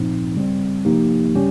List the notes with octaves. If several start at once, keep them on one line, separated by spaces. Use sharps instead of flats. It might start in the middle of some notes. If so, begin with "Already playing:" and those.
Already playing: A#2 F3 C4 D#4
C#3 G3 C4
C3 F3 A#3 D#4 G4
C#3 G3 C#4 G4